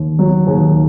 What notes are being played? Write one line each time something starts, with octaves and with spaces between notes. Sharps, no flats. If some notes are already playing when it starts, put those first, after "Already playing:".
Already playing: D#2
F#3
D#2 G#4